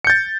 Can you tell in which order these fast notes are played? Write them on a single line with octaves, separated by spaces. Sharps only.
C#7 G6 A6